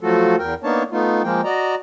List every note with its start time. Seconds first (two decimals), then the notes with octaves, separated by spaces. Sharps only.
0.01 F3 F#3 A3 F4 F#4 A4
0.39 E2 A#4 G5
0.64 A#3 B3 D4 D#4 C#5 A5
0.91 A3 B3 D#4 F4
1.24 F3 G#3 A#3 G5
1.45 F#4 D5 D#5 A#5